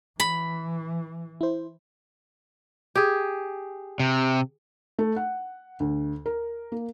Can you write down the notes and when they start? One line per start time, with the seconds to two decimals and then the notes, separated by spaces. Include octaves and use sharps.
0.20 E3 B5
1.41 E4 C5
2.95 G4 G#4
4.00 C3
4.99 A3
5.16 F#5
5.80 D2
6.26 A#4
6.72 A#3